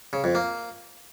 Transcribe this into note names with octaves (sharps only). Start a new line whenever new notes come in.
C#3
F2
A#3